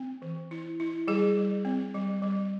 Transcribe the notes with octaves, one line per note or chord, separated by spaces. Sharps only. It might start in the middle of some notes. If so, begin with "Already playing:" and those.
Already playing: C4
E3
E4
E4
G3 G#4
G3
C4
G3
G3